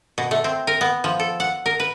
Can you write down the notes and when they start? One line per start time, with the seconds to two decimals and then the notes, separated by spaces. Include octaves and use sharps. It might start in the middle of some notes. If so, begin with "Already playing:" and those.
0.18 B2
0.31 A3
0.44 C4
0.67 A#4
0.81 B3
1.04 F3
1.19 A4
1.40 F#5
1.66 A#4
1.80 B4